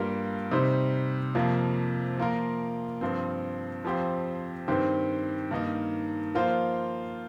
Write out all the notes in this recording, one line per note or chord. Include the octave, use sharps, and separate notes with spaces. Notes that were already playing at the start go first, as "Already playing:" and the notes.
Already playing: G2 G3 A#3 F4 A#4
C3 G3 D#4 C5
F2 C3 F3 A#3
F3 A#3 F4 A#4
G2 F3 C4
F2 F3 C4 G4
G2 D#3 C4 G4 C5
G2 D#3 A#3 D#4
F3 A#3 F4 C5